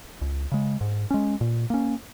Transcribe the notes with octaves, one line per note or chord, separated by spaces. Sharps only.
C#2
C#3 G#3
G#2
G#3 C#4
A#2
A#3 C#4